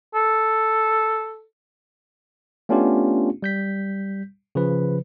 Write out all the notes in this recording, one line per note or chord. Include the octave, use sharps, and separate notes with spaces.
A4
A3 B3 C#4 D4 F4 G4
G3 G6 B6
C#3 F3 B4